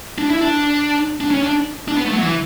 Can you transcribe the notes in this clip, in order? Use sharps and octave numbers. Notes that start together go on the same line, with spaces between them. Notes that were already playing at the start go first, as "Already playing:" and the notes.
D4
E4
D4
D4
C#4
D4
D4
B3
A3
F#3
E3